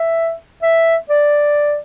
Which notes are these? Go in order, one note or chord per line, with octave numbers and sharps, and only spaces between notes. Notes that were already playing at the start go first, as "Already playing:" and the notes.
Already playing: E5
E5
D5